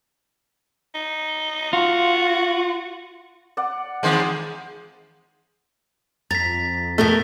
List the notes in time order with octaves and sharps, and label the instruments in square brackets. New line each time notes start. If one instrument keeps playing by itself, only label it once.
[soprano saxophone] D#4
[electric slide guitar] F4 [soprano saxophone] F#4
[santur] D5 F#5
[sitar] E2 D#3 G#3 [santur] C5 C6 D#6
[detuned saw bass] F2 [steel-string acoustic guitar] A#5 [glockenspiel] A6 B6
[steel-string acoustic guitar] B2 A#4 D#5 [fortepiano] A3